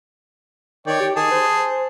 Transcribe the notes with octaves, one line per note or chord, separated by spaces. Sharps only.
D#3 C#5 D5 G5
G4
D#3 G#4 A5
C5